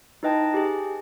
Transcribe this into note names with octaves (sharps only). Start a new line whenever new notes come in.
D#4 E4 B4 D#5 G5 A5
G4 G#4